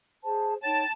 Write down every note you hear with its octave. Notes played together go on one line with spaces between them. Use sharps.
G#4 C5 A5
D#4 C#5 G5 A5